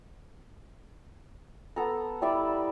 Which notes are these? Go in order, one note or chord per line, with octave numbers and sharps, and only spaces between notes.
B3 A4 A#5
G3 E4 D5 E5